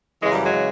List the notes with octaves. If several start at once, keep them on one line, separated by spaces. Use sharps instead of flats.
F#2 C#3 E3 G#3
G3
F#3 G#3
C#3 E3